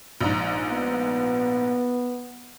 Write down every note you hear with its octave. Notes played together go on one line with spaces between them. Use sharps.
A#1 G#2
B3